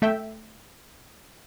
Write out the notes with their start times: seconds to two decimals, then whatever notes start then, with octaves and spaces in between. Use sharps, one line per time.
0.02 A3 E5 G5